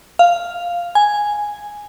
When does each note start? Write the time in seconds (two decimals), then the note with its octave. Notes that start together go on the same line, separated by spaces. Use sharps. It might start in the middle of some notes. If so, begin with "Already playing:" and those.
0.19 F5
0.95 G#5